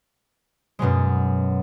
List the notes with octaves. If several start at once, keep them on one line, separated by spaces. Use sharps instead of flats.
F#2 B2 F#3 G#3